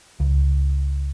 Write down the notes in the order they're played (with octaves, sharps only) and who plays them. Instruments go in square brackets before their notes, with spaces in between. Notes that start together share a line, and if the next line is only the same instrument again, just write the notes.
[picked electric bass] C#2